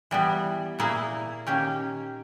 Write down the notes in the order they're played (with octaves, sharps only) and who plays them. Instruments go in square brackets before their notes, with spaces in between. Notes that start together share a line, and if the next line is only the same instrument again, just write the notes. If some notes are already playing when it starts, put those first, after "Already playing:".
[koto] E3 G3 B3
A#2 A#3 E4 G#4
D#3 A#3 C#4 G4